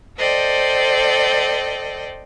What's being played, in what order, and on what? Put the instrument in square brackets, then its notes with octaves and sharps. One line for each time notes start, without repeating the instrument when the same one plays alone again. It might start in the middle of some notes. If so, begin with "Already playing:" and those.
[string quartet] A4 C5 D5 D#5 G5